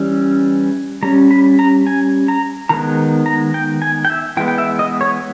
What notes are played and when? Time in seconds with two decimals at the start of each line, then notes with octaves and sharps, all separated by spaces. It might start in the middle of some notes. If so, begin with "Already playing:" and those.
Already playing: E3 G3 C#4
1.03 G3 C#4 A#5
1.31 B5
1.59 A#5
1.87 G#5
2.28 A#5
2.69 D#3 G#3 B3 A#5
3.26 A#5
3.54 G5
3.82 G#5
4.05 G5
4.10 E5
4.37 E3 G#3 B3 G5
4.48 G5
4.58 E5
4.79 D#5
5.01 C#5